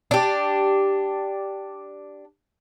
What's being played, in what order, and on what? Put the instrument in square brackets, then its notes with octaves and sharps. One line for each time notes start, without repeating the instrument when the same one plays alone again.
[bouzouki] D4 G4